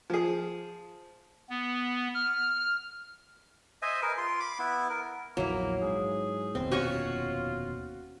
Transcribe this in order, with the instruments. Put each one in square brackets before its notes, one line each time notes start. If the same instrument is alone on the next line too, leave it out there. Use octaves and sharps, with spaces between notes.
[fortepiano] F3 G#4
[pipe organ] B3
F6
[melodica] C5 D#5 E5 G#5
G#4 A#4 B4
F4 C6
B5 D6
B3 E4
A#4
[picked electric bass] A#1 E2 [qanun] F#3 E4 [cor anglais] A#3
[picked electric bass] G#2 [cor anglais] G#4
[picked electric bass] F1 D#2 B2 [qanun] C4
[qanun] C#4 C#5 G#5 [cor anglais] F4 [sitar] F#4